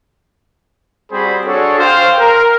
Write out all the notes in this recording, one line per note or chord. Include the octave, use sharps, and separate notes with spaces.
G3 C4 F#4 G#4 C5 B5
D4 F#4 G#4 A4 C#5
C5 F5 G5
A#4